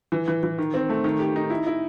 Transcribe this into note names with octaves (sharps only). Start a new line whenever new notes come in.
E3
E3
E3
D#3
C4
A3
D#3
G4
D#4
E4
E4